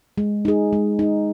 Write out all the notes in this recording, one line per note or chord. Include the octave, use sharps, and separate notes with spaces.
G#3
D#4 G#4
G#3
D#4 G#4